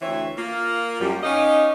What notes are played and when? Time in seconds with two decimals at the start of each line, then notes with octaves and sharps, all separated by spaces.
0.01 D2 E3 C4 C#5 E5
0.36 A#3 F4
1.00 F#2 G3
1.22 C#4 D#4 G4 D#5 F5